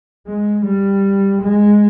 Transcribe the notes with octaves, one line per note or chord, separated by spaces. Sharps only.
G#3
G3
G#3